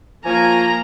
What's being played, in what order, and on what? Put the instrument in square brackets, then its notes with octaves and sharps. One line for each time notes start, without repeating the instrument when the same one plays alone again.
[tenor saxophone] F3 [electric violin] A#3 A#5 [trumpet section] C#5 G#5